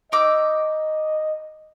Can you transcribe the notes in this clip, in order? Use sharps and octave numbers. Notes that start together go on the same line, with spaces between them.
D#4 D#5 D6 E6